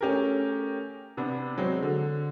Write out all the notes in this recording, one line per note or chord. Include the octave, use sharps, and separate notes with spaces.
A3 C#4 G4 G#4 A#4
C3 B3 D4
F#3 G#3 C4
D3